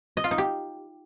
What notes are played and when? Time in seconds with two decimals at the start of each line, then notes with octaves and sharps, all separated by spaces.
0.17 D#5
0.24 F4
0.31 D#4
0.38 G4